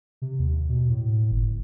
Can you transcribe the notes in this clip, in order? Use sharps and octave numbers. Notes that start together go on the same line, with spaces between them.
C3
D#2
B2
A2
G1